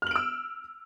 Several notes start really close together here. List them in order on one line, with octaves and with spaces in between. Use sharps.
F6 F#7 D7 E6